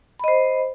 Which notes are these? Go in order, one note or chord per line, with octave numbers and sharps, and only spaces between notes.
C5 D#5 B5